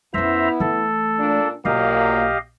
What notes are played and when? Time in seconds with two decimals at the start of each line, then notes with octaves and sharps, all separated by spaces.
0.14 F2 B3 C#4 E4 C5 E5 A#5
0.60 E3 A3 A4
1.19 A#2 D4
1.65 B1 A#2 F#3 A#3 G4 D#5 F5